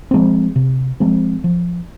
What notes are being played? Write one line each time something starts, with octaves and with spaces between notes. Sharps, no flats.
F3 G#3 C4
C3
F3 G#3 C4
F3